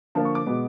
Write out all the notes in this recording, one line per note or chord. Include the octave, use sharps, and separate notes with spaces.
D3 F3 A#3 A5
C#6
D6
B2 G#3 B3